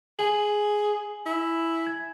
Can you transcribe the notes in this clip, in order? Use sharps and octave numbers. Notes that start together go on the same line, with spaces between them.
G#4 G#5 F#7
E4
G#6